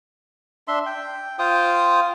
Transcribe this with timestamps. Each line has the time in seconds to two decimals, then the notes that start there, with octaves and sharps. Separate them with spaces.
0.68 D4 E5 C6
0.86 G5
1.39 F4 C5 G5 D#6